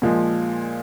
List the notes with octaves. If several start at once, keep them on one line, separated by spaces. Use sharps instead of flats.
A#2 F3 G#3